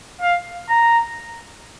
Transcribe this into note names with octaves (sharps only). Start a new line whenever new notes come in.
F5
A#5